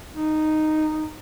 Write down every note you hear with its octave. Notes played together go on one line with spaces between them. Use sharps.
D#4